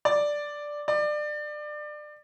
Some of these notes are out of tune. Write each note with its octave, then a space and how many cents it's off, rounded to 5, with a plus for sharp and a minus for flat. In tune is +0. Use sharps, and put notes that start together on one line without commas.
D5 +0
D5 +25